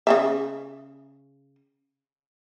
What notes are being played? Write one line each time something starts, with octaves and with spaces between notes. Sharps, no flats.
C#3 B3 E5